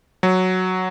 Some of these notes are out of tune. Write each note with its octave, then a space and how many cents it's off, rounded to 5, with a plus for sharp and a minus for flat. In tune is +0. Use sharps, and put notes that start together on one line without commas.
F#3 +0 F#4 +0